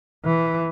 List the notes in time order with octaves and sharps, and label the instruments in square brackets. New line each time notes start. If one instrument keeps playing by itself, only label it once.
[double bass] E3